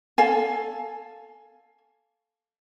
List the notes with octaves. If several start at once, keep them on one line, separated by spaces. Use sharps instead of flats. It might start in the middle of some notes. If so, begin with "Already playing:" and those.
A4 F5 G#5